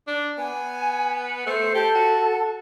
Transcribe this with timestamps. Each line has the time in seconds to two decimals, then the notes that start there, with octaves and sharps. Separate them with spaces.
0.07 D4
0.38 B3 G#5
1.47 A3 C5
1.75 G4 A4
1.95 F#4